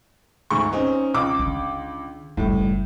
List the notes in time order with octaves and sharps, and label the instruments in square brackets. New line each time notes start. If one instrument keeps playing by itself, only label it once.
[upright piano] D2 G#2 C#6
C4 C#4 D#4
C#2 D#5 D6
[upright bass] D3
[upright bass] F#1 G3 [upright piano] A2